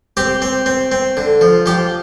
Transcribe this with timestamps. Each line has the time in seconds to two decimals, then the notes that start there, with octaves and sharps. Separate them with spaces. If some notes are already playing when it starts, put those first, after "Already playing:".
0.17 C4 G4
0.42 C4
0.66 C4
0.92 C4
1.17 D3
1.41 F3
1.66 F3 G4